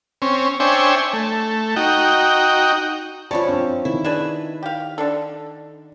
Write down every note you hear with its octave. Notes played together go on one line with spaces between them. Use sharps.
C4 C#4
D4 C5 C#5 E5 G5 G#5
A3
D#4 F#4 G5
F3 C#4 C#5 D5 A5 B5
C4 D4
D#3 E4
D4 G#4 B4 E5
G4 F5
D3 D4 A4